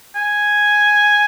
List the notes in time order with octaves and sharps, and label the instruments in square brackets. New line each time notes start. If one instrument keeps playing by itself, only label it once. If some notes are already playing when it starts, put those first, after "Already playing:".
[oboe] G#5